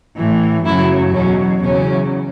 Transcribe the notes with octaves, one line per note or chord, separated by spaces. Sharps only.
A2 E3
F#2 C#3 F#3 E4
E2 B2 F#3 C#4
E2 C#3 F#3 C#4